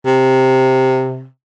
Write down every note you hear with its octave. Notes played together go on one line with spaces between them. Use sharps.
C3